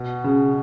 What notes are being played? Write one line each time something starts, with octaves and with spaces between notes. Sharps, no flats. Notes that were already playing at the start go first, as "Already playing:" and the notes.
Already playing: B2
C#3